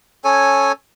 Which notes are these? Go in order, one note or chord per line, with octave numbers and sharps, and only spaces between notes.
C#4 A4 C#5 G#5